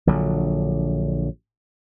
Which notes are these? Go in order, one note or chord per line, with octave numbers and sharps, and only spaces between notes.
A#1 D3 F#3